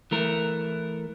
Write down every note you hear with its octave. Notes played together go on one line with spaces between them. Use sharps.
E3 A3 A#4